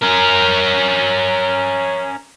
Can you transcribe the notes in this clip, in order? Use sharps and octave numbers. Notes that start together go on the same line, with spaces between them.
C#4 A#4